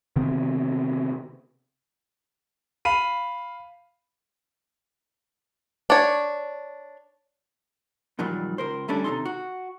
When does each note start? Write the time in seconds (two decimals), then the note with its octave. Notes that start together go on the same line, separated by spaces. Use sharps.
0.16 C3 D#3 B3 C4
2.85 F5 B5 D#7
5.90 D4 C#5
8.19 F2 A#2 D#3 F#3 G3
8.58 C#2 A#4 C5
8.88 D2 G3 A3 C#4 D4 A4
9.04 D#2 C3 F#3 D#4 A4 C6
9.25 F#4